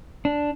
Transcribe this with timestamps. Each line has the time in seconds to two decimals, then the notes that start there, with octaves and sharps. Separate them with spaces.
0.25 D4